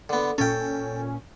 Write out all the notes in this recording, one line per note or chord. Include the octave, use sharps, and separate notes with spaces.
D3 B3
A#2 C#4 A4 G5